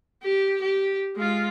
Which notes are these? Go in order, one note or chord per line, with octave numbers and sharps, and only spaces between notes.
G4
G4
G#3 F4